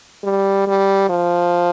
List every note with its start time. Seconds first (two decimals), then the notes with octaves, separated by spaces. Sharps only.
0.24 G3
0.67 G3
1.10 F3